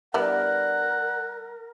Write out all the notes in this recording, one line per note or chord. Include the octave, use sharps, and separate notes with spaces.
G3 B3 D4 E4 A#4 B4 D5 F#5